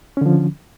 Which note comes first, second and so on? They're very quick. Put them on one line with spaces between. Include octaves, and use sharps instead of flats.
C#4 D3 F3